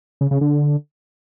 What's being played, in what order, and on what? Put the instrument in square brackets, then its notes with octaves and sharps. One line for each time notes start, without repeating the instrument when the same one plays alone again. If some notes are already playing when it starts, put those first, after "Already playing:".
[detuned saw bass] C#3
C#3
D3